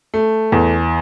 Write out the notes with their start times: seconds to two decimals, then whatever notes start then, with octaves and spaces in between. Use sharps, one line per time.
0.14 A3
0.52 E2